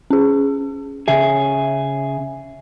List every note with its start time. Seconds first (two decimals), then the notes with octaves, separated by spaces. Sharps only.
0.11 C#4 G#4
1.08 C#3 G#4 E5